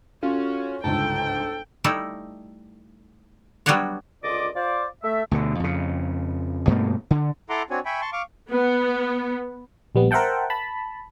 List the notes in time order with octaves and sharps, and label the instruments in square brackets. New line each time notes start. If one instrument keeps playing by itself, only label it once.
[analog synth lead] C#4 [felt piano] F4 A4 F5 [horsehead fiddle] F#4
[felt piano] G1 C#2 G#2 [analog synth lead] A4 [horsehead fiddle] G5
[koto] G3 A3 D#4 E4
F#3 G3 B3 D4 F#4 C#5
[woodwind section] C#2 D3 F4 D5 D#5 D6
F4 C5 D5
A3 E5
[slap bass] D2 B2 D3
F2 C#3
G2 B2 A3 A#3
D3
[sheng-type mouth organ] E4 A4 F#5 A#5 C6 D6
C4 D4 F#4 C#5 G#5
E5 G5 G#5 B5 C#6
A5 C6 C#6
F5 C#6 D6
[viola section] B3
[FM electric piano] A#1 G3 B3
A#4 C5 E5 F#5 G5 A5
A5 B5